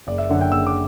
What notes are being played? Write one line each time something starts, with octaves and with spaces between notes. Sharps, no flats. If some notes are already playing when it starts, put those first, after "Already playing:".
F#1 D5
E5
F#2 D3 F#5
G5
F#1 E6
D6